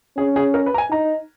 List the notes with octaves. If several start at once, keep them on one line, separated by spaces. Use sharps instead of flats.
C#4 G#4
G#4
A#4
B4
A#5
G#5
D#4 A#5